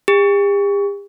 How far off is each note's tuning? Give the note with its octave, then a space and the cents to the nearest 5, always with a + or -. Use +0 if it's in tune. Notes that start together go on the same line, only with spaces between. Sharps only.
G4 +45